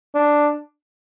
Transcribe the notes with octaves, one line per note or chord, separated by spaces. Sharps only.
D4